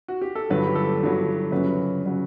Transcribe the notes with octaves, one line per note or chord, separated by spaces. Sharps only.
F#4
G4
A4
G1 G2 F#3 B4
G4
A4
G1 G2 F#3
G1 F#2 C#3 F#3 B4
C#3 F#3